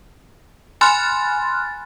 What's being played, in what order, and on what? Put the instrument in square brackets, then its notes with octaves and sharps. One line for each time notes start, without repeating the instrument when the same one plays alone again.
[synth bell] G#5 B5 C6 F6 F#6 A6